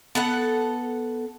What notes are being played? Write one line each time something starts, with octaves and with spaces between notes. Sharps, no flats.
B3 A4 F#5